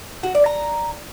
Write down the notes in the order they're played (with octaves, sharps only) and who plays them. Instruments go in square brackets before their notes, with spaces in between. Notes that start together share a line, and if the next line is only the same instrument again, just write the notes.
[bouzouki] F#4
D5
A#5